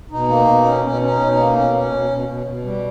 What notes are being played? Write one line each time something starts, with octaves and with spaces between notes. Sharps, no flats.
B2 D#4
A#3
B2
C#4
B2 C#4
C#4
D#4
B2
D#4
A#3
B2 C#4
C#4
B2
B2
B2
B2
G3